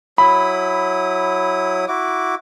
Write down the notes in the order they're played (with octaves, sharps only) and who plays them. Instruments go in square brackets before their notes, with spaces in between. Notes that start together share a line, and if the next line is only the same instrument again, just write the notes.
[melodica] F#3 E4 D#6 [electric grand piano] B5
[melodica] E4 F#4 D6